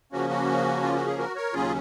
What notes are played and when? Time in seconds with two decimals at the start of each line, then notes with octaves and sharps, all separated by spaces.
0.12 C#3 F3 A#3 C#4 F#4
0.30 F#4
0.83 F4
0.95 F#4
1.07 G#4
1.18 F#4 A#4
1.36 A#4 C#5
1.53 D#2 C#3 F#3 C#4 F4 G#4